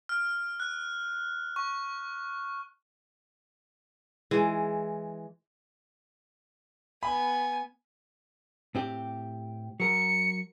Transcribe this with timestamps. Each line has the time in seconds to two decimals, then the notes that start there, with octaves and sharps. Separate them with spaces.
0.09 F6
0.60 F#6
1.56 C#6
4.31 E3 G#3
7.03 B3 G#5 B5
8.75 A2 C4 G4
9.80 F#3 A#4 C#7